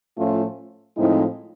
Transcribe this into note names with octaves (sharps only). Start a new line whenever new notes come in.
A2 F3 A3 C#4 F4
A2 F3 G#3 C4 D#4 E4